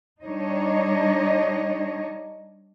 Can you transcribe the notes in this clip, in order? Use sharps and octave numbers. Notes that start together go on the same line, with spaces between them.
G3 D4 D#4 C#5 D#5